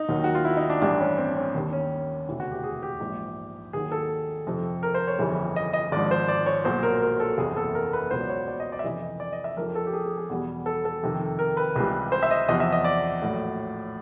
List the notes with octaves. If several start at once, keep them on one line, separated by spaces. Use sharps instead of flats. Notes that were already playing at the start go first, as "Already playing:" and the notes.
Already playing: D#4
D#2 D#3 F#3
F#4
F4
E4
D#4
D4
A1 G2 E3 G3 D4
C#4
C4
C#4
D#2 D#3 G3
C#4
E1 D2 C3 E3
F#4
G4
G#4
G4
A#1 G#2 E3
D#2 D#3 F#3 G#4
A4
F2 C3 F3
A#4
C5
C#5
G1 F2 C#3 E3 G3
D#5
D#5
G#1 G#2 F3 D5
C5
D5
C#5
B1 A#2 F#3 C5
A#4
A#4
A4
F#1 E2 C3 G#4
A4
A#4
B4
C#2 B2 F#3 C5
D5
C#5
D5
D#5
D5
E5
F2 C3 E3 D#5
D#5
D5
D#5
E5
F2 C#3 F3 A#4
A4
G4
G#4
G#4
G#4
E2 B2 G3
A4
A4
F2 C3 D#3
A#4
B4
C#2 C3 E3 G3
C5
E5
D#5
E2 C3 F3 D#5
E5
D#5
D5
A#1 A2 F#3